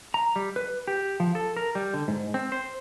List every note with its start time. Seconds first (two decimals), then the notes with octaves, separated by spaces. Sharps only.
0.14 A#5
0.36 G3
0.56 B4
0.87 G4
1.20 F3
1.35 A4
1.57 A#4
1.75 G3
1.94 D3
2.08 G#2
2.34 C4
2.52 C5